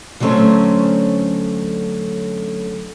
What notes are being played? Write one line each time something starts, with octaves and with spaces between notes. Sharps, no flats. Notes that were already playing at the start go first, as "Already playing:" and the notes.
D3 F#3 G3 A3 C4 C#4